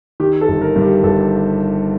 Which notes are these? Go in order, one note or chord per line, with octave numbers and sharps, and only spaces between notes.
D#3 G4
A4
G1
A#4
G2
G4
G1 A4